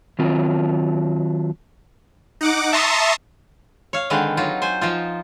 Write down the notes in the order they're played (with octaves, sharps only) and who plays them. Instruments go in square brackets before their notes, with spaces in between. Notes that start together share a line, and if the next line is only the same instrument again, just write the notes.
[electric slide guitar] D#3 F#3 C4 F4
[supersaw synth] D#4 F#5 D6
E5 A5 A#5 C6 C#6 D#6
[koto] C#5 F5
D3 D#3 G#3 C4 B4 F5
F#3 D#4 F4
C5 G#5
F3 D#4 F4